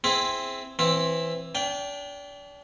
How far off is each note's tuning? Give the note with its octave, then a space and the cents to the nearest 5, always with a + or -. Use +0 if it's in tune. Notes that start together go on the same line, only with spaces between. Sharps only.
C4 +0 E4 +0 G#4 +0
E3 +0 C4 +15 E4 +0
D4 -40 G5 +0